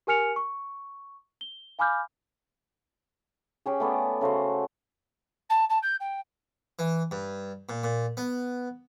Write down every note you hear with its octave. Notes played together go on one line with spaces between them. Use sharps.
G4 A#4 G#5 F6 C#7 F7
C#6
G7
F5 G#5 B5 D6 F6 G6
C#4 G4 G#4
A3 B3 D5 G#5
C#3 A3 F#4 C5
A5
A5
G6
G5
E3
G2
A#2
A#2
B3